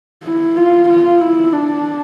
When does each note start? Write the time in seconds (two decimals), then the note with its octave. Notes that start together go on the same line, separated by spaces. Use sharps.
0.24 E4
0.57 F4
0.89 F4
1.21 E4
1.53 D4